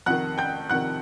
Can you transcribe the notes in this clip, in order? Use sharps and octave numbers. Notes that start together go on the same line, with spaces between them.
F2 C3 D#3 F#5 F#6
G5 G6
F2 C3 D#3 F#5 F#6